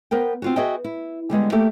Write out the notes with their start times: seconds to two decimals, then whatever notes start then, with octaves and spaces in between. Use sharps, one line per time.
0.11 B3 A#4 C5 G5
0.42 C4 F4 F#4
0.56 F#4 G#4 B4 D#5 E5 G5
0.84 E4
1.30 D3 G3 G#3 B3
1.52 A3 A#3 G4 A4